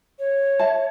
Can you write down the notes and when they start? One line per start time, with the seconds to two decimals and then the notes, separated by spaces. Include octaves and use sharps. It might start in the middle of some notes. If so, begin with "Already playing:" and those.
0.19 C#5
0.59 E5 A5